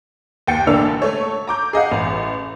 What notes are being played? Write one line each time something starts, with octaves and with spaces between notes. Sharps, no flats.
D#2 G5 A6 C#7
A1 D3 A#3 D4 E6 F7
A3 C#5
A#5 D6 G6
G#4 D#5 F5 F#5
A1